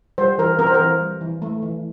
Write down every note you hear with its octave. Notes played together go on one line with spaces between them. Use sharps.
G3 C5
E3 A#4
C4 A#4
C5
A#4
E3
G3
E3
A3
E3